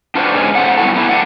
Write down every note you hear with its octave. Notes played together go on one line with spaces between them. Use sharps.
D4 F4 F#4 B4 C5 D5
G#2 D3 G#3 C#4
A3 C4 F#5
G3 B3 C#4 E4 F#4 A4
A3 B3 D4 E4
A2 C4 D5 F#5